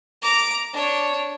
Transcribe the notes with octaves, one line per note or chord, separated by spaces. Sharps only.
A#5 D6
D4 C#5